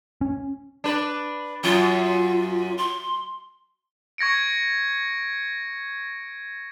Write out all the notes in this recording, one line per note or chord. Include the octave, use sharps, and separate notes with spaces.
C#4
D4 B4
F#2 F4
C6
C#6 G#6 A#6 C#7 D7